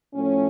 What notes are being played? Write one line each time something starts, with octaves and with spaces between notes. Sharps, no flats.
A2 F3 A3 C#4